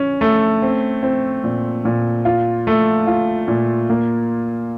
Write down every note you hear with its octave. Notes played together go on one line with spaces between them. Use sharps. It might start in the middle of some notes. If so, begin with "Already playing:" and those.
Already playing: C#4
A3
C4
C4
A#2
A#2
F4
A3
F4
A#2
A#3